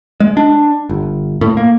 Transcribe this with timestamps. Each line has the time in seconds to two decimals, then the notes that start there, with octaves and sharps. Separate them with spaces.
0.20 G#3
0.37 D4
0.89 G1
1.41 A2
1.57 A#3